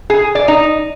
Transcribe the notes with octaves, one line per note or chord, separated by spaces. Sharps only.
G#4
D5
D#4